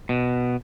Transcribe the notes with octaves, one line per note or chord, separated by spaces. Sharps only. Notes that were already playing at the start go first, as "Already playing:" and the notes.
B2